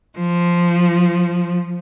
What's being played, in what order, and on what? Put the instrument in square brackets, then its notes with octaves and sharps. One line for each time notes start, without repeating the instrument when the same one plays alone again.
[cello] F3